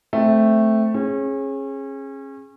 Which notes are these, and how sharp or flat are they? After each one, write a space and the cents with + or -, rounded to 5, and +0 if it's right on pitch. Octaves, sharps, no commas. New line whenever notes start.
A3 +0 C4 +0
C#4 -30 G#4 +0